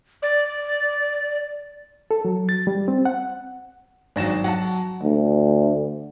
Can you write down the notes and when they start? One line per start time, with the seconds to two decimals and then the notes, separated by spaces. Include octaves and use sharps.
0.23 D5
2.11 A4
2.25 F#3
2.49 A6
2.67 G3
2.88 C4
3.05 F#5
4.16 G#1 F#3 D4 A#6 E7
4.44 F#3 F#5 A5
5.02 D2